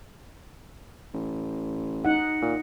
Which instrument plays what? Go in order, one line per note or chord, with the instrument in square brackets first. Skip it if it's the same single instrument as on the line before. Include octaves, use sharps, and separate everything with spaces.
[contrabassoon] A1
[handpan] D#4 F#5
[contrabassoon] A#2